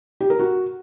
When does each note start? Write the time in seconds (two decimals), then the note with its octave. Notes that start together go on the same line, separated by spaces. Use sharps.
0.21 G4
0.30 A#4
0.39 F#4